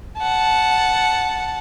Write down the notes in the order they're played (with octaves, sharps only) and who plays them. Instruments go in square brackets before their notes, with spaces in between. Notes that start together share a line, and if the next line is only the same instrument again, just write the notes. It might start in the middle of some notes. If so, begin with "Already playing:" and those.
[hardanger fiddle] F#5 A5